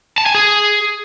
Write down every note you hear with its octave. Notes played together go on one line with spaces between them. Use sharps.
A5
G#5
G#4